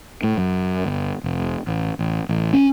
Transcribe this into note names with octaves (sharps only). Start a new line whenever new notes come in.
A2
F#2
G1
F1
A1
A1
A1
C#4